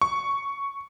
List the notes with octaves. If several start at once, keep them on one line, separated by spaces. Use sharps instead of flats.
C#6